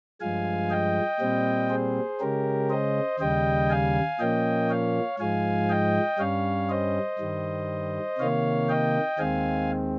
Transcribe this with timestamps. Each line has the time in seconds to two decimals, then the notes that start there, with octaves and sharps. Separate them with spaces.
0.20 G2 F3 G#3 F5 G#5
0.70 D#5 G5
1.20 A#2 G3 C4
1.70 G#4 C5
2.20 C#3 G#3 C#4 G4 A#4
2.70 C5 D#5
3.19 D#2 C#3 G3 D#5 G5
3.69 F5 G#5
4.19 A#2 F3 A#3 C#4 D#5 G5
4.69 C#5 F5
5.19 G#2 F3 G#3 F5 G#5
5.69 D#5 G5
6.19 G2 G3 C#4 C#5 F5
6.69 C5 D#5
7.19 G2 D#3 G3
8.19 C3 D#3 A#3 C#5 F5
8.69 D#5 G5
9.19 D#2 D#3 G#3 C4 F5 G#5